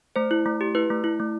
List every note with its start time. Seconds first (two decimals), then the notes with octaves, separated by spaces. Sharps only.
0.16 A3 C5
0.31 E4
0.46 A3
0.61 G4
0.75 E4 B4
0.90 A3
1.04 E4
1.20 A3